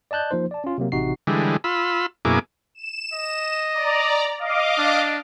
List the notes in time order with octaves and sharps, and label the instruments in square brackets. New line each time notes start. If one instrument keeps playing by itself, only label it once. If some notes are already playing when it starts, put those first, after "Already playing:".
[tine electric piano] D5 D#5 A5 F#6 G6
F3 A#3 D#4 C5
D5 A5
C#4 F4
C3 F#3 A#3
A1 C3 D#4 F#4 C7
[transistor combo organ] D3 E3 G3 G#3
F4 B5 E6
F#2 B2 A#3 E4 G#4 D6
[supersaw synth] E7
[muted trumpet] D#5
[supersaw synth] D5 A#5
D#5 F5 D6
[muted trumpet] D4